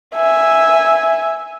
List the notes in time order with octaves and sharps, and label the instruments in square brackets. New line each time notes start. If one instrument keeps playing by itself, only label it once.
[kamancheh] E5 G#5